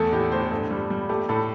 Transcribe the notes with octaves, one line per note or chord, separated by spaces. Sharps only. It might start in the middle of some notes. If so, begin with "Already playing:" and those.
Already playing: E2 A3 A4
A2 G4
A2 C5
G2 A4
G3
G3
A3 G4
A2 A4